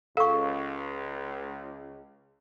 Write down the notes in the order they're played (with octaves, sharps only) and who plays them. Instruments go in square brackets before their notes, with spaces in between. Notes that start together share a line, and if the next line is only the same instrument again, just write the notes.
[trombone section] C#2 [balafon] A4 [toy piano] F5 C#6